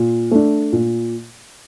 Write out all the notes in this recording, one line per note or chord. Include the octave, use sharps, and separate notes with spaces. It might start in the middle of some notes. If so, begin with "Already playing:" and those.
Already playing: A#2
A3 D4
A#2